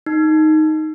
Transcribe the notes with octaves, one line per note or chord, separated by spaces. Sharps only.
D#4